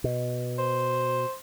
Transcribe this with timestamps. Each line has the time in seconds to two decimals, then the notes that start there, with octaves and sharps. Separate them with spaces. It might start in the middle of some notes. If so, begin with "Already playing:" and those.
0.04 B2
0.59 C5